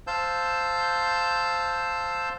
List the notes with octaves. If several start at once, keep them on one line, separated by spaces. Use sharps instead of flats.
C5 F5 A5 E6 G6